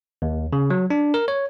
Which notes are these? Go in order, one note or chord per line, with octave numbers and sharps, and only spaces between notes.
D#2
C#3
F#3
D4
A#4
C#5